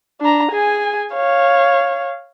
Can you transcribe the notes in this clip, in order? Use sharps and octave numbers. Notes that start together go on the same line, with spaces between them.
D4 A#5
G#4 G#5
C#5 F5